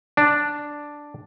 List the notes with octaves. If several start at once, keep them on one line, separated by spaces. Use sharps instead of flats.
D4